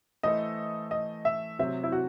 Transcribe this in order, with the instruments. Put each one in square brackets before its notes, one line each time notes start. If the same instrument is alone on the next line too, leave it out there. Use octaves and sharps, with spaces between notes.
[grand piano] E3 A3 E4 A4 C5 [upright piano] D#5
[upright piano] D#5
E5
[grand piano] C3 F#3 C4 [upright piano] E5
[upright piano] E4
F#4